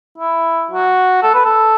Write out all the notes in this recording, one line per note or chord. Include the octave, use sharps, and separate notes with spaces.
E4
F#4
A4
B4
A4